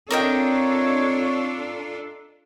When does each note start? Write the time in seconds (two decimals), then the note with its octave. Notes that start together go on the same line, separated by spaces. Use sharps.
0.11 C4 D4 F4 A4 A#4 C#5 D#5 G5